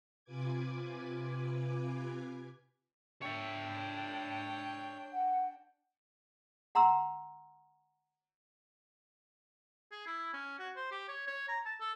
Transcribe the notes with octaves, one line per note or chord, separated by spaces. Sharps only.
C3 F4 B4 G#5 D6 G#6
D4 C#5 E5 G5
F#5
F#5 A#5 C6 E6
G#4
E4
C#4
F#4
C5
G4
C#5
C#5
A#5
A5
A4